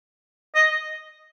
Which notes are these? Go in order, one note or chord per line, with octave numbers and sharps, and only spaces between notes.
D#5